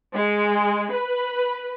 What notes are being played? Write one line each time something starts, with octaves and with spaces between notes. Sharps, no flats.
G#3
B4